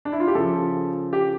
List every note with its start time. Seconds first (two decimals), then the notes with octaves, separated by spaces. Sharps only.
0.05 D4
0.12 E4
0.20 F4
0.28 G4
0.35 C#3 F3 A4
1.13 G4